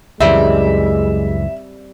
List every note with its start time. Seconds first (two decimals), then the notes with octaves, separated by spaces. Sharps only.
0.20 C#2 F#2 E3 G3 G#3 C4 E5